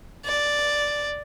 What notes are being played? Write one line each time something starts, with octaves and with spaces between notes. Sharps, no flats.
D5